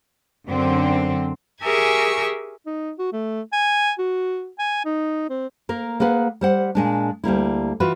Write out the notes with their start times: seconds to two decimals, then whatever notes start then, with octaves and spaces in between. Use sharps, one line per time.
0.49 F#2 D3 C4
1.63 G4 G#4 A#4 E5 G#5 C#6
2.66 D#4
2.99 F#4
3.13 A3
3.53 G#5
3.99 F#4
4.59 G#5
4.85 D#4
5.30 C4
5.69 A#3 A#4
6.00 A#3 G#4 B4 F#5
6.41 G3 C5 F#5
6.75 A#2 G#3 D4
7.24 D2 G3 A#3 E4
7.80 E3 F4 F#4 B4